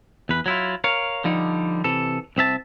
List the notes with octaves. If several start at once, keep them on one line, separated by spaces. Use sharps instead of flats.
E2 B4
F#3 E4 F4
A#4 C#5 F5
D3 F3 G3 D#4
C3 E3 A4
C2 C4 E5 A5